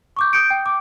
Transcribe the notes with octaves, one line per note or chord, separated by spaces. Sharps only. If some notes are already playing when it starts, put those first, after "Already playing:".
C#6 D6 G6
D#6 G6 C#7 D7
G5
D6